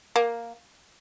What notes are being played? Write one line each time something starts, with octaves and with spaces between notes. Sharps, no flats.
A#3